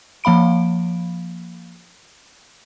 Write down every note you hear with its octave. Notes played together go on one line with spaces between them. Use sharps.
F3 A#3 F5 B5 D7